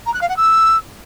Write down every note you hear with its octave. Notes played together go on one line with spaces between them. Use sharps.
A#5
F#6
F5
F#5
E6